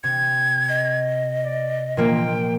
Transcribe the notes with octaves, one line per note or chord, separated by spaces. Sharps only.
C3 G#6
D#5
D5
A#2 F3 A#3 G5